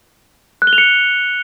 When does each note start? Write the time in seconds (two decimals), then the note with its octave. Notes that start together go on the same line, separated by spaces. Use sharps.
0.62 F#6
0.67 G7
0.73 F7
0.78 C#7